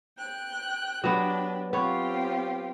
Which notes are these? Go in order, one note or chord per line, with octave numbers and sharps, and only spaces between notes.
G5 F#6
F#3 B3 D4 G4 B4
B3 C4 F4 G4 C#5